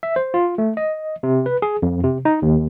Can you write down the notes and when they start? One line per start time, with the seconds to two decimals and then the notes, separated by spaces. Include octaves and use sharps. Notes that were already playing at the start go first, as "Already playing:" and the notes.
0.03 E5
0.16 C5
0.34 F4
0.58 A3
0.77 D#5
1.23 C3
1.46 B4
1.62 G#4
1.82 F2
2.04 C3
2.25 D#4
2.42 D#2